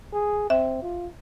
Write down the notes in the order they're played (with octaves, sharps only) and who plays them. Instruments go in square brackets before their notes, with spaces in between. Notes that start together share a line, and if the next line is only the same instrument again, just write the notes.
[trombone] G#4
[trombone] C4 [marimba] E5
[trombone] F4